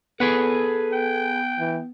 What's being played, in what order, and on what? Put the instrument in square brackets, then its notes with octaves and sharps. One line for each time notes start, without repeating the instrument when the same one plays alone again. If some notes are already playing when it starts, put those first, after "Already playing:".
[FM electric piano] B3 [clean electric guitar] G#4 B4 F#5 [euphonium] A4
[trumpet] G5
[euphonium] E3